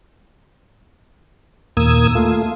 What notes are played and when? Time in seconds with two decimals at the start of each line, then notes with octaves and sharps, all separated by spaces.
1.77 D#2 A#2 A#3 D#6 E6 G#6
2.15 A3 F4